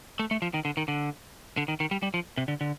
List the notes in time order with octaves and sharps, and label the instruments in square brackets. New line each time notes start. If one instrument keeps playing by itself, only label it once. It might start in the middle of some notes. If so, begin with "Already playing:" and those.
[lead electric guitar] A3
A3
F3
D#3
D3
D#3
D3
D3
D#3
D#3
G3
G3
F3
C3
D3
D3